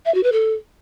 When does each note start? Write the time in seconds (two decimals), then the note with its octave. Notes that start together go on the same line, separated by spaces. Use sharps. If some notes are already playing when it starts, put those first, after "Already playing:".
0.05 E5
0.14 F#4
0.23 B4
0.32 A4